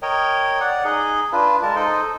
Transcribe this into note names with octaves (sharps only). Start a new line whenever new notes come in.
A#4 C#5 D#5 G5
D5 F#5
D#4 G#4 D#5
D4 F4 B4
G#3 A#4 A5
D#4 A4 C5 D#5